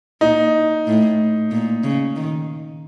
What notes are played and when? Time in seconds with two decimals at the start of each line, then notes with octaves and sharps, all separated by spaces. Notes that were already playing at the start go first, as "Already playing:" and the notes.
0.21 A#2 D#4
0.87 A2
1.51 A#2
1.84 C#3
2.16 D#3